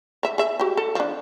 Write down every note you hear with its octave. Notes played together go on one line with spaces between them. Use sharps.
C#5 E5
G#4 E5
F#4 G4
A4
F3 D4